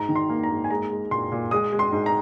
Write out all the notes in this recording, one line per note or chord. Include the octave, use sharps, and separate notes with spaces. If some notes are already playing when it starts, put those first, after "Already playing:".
Already playing: G#2 A#5
D#3
C6
A#3
A#5
G#2
G#5
G#3 A#5
G#3
A#2 C6
A#2
G#3 D#6
G#3
C6
G#2
A#5